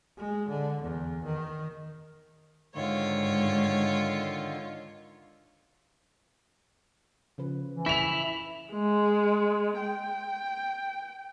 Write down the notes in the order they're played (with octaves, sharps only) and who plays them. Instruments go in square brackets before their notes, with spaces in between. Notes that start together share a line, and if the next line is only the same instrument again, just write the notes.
[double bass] G#3
D3
E2
D#3
[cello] G#2 [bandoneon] D3 D#3 [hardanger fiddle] F4 C#5
[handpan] C#3 F3 B4
[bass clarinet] E3
[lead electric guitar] E4 [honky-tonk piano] B6 F7
[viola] G#3
G5